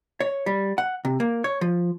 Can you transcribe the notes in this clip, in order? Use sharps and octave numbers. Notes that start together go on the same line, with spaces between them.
C#5
G3
F#5
C3
A#3
C#5
F3